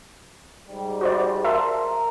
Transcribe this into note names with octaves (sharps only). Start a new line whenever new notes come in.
G#2 G3
F#4 C5 D5
A#4 E5 A5 C6